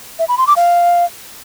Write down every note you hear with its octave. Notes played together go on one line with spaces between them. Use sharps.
E5
B5
C6
D6
F5